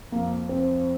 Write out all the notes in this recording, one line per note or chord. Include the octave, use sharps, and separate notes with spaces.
F2 A#3
C4